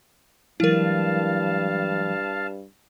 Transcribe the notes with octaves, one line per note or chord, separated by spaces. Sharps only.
G2 E3 F#3 G#3 E4 A#4 F5 A5